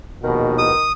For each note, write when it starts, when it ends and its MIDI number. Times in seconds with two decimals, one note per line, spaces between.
0.24 0.70 34
0.24 0.70 39
0.24 0.70 47
0.24 0.90 51
0.58 0.92 87